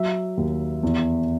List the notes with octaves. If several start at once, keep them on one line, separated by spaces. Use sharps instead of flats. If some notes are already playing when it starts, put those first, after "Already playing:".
Already playing: F#3 E5
D#2
E2